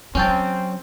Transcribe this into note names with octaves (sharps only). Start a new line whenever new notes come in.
F#3 C4 C#4 G5 A5